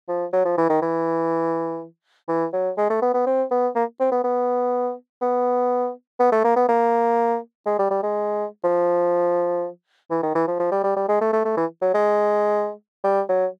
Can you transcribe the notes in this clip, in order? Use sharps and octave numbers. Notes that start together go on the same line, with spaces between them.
F3
F#3
F3
E3
D#3
E3
E3
F#3
G#3
A3
B3
B3
C4
B3
A#3
C4
B3
B3
B3
B3
A3
A#3
B3
A#3
G#3
G3
G3
G#3
F3
E3
D#3
E3
F3
F3
G3
G3
G3
G#3
A3
A3
A3
E3
F#3
G#3
G3
F#3